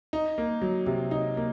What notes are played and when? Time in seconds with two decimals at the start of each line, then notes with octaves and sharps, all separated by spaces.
0.13 D#4
0.38 A#3
0.62 F#3
0.86 C3
1.11 D#4
1.37 A#3